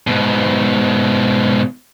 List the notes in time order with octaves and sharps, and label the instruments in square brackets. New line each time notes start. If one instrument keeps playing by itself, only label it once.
[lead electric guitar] G#2 B2